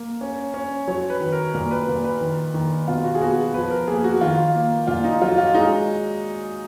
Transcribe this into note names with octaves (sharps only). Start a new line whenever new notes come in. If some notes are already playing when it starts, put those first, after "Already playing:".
Already playing: A#3
C#4
C#4
F#3 C#5
B4
D#3
A#4
A#2 A#4
B4
A#2
B4
D#3
D#3
B2 F4
F#4
G#4
B3 F#4
F3 B4
A#4
A#3 G#4
F#4
D#3 F4
A#3
A#2 F4
D#4
F#3 F4
F4
G#3 D#4